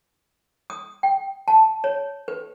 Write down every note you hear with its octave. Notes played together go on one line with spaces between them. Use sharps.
D#6
G5
A5
C#5
B4